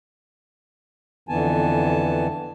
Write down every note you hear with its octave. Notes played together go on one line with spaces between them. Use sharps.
F2 D3 E3 B3 G#5 A5